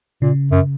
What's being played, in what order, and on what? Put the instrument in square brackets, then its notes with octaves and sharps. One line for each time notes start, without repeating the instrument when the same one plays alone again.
[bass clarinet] A#2 [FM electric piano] C#3
[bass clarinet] F#2